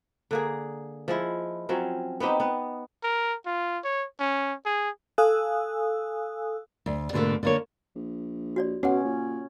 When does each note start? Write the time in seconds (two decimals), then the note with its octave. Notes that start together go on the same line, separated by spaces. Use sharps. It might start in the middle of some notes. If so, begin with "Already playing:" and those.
0.31 D3 A#3 G#4
1.08 F3 G#3 E4
1.69 F3 F#3 C4 C#4
2.20 B3 C4 D#4 G4
2.40 B3
3.04 A#4
3.46 F4
3.84 C#5
4.20 C#4
4.65 G#4
5.18 A4 F5 G#5 D#6 E6 F#6
6.86 D2
7.13 G#2 B2 D3 E3 A3 A#3
7.43 D3 A#3 C#5
7.95 A#1
8.56 F#4 C#5 D5
8.83 B2 C#4 F#4 F#5
9.04 A#2